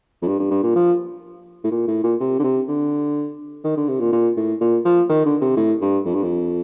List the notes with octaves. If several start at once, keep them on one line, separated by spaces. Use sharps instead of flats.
F2
G2
G2
G2
A#2
F3
A2
A#2
A2
A#2
C3
D3
C3
D3
D#3
D3
C3
A#2
A#2
A2
A#2
F3
D#3
D3
C3
A2
G2
F2
G2
F2